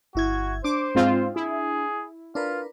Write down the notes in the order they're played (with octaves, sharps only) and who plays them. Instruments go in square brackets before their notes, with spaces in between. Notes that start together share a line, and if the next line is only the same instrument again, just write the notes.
[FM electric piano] G1 E4 G#6 [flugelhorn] F#4
[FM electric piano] D4 [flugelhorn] C5 [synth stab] D6
[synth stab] G#2 C4 F4
[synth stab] E4 [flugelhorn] G#4
[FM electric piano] D4 A#4 B4 [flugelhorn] F4